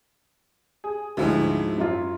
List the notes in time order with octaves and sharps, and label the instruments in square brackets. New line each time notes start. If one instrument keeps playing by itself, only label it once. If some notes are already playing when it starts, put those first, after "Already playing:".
[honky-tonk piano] G#4
[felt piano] D2 [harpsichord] G#2 F3 [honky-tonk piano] F#3 E4
[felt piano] F#2 F4